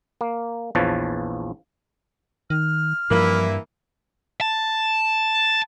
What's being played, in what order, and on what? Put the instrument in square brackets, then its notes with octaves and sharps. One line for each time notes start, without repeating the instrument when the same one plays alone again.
[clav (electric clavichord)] A#3
A#1 E2 F3 B4 C#5 A5
[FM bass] D#3 [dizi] F6
[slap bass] G2 [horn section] E3 A#3 E4 [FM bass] F3
[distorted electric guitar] A5